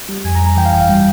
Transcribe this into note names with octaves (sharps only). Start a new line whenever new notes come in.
G3
F2 G#5
A#5
F2
A#5
E3 G5
F5
G1 G5
F5
G3 G5